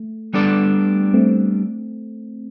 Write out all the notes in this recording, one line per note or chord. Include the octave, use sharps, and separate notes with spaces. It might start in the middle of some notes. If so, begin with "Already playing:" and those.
Already playing: A3
G3 B3 D4 A4 D5
A3 C4